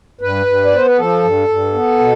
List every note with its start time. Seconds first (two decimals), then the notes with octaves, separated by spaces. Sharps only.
0.21 G2 B4
0.46 G2
0.65 D5
0.72 B3 C5
0.86 B4
0.98 F3 A4
1.23 G2
1.48 G2
1.74 B3
1.99 B2